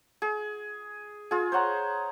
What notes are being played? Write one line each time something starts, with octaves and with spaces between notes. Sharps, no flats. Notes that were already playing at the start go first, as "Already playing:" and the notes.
G#4
F4 G#4
C5 C#5 F#5 A#5